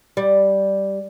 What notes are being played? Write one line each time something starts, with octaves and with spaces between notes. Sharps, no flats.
G3